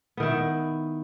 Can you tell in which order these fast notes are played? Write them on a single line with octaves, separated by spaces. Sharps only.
B3 D#3 E4